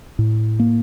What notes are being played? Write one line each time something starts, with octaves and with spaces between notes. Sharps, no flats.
A2
A#3